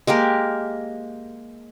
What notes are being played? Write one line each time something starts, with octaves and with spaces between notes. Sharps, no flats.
G#3 A#3 G4 A#4